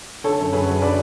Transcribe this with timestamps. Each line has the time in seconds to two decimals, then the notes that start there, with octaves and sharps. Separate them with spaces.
0.24 D3 A4 C#5
0.38 F#2
0.52 F#2 G#4 B4
0.67 F#3
0.82 D3 B4 D5